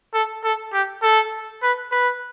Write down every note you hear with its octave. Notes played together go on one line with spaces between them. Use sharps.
A4
A4
G4
A4
B4
B4